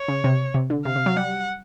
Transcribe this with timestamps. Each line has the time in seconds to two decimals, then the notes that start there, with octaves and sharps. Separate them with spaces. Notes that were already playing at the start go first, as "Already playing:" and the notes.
Already playing: C#5
0.08 C#3
0.24 C3
0.54 C3
0.70 D3
0.85 C3 F5
0.96 C3
1.06 F#3
1.16 G3 F#5